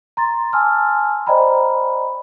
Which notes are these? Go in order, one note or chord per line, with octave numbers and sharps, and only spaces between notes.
A#5 C6 A6
G#5 A5 C6 D6 E6 F6
C5 D5 D#5 G5 A#5 B5